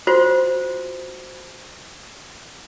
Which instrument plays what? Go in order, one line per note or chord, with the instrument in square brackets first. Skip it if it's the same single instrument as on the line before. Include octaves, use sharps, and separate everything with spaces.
[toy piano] F4 F#4 C5